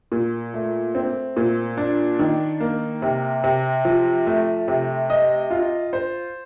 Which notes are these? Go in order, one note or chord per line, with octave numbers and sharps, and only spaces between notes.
A#2
A3
C4
A#2
D4
D#3
A#3
C3
C3
F3
A3
C3
D#5
F4
C5